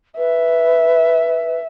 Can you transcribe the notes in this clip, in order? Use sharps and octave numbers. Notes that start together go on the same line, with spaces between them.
B4 E5